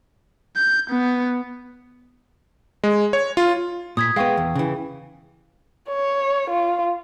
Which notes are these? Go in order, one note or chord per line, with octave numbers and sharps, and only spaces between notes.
G6
B3
G#3
C#5
F4
A#2 D#6 G#6 B6
G#3 B3 F5 G5 C#6
E2
C#3 E3
C#5
F4